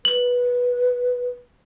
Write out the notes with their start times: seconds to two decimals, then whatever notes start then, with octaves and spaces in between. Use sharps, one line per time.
0.05 B4 F#7